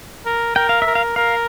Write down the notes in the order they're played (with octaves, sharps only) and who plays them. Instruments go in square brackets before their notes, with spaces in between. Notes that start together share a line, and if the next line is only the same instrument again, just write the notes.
[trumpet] A#4
[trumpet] A#4 [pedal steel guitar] G5
[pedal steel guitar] F5
E5
[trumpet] A#4
[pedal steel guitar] F5
[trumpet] A#4 [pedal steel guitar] F5